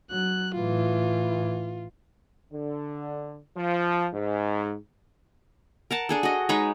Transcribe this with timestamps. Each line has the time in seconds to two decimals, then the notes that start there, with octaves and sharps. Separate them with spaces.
0.11 F#3 F#6
0.55 A2 E3 F4
2.52 D3
3.57 F3
4.13 G#2
5.91 A#4 F#5 A5
6.09 D4 G#4 A4
6.23 F#4 D#5
6.49 G#3 D#4 B4 C#5